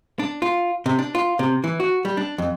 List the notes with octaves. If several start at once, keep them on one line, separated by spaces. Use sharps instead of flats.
D4
F4
C3
D4
F4
C3
E3
F#4
G3
D4
F2